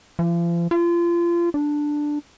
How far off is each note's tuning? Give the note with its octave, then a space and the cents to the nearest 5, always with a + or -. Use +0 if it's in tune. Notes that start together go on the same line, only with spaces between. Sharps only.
F3 -40
F4 -30
D4 +5